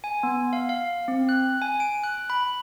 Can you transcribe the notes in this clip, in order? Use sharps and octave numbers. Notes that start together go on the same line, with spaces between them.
G#5
B3
F5
F5
C4
F#6
G#5
D7
F#6
B5